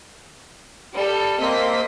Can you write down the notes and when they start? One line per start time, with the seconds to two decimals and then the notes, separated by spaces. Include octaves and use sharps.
0.95 G3 A4
1.40 A#3 C4 D#5 B6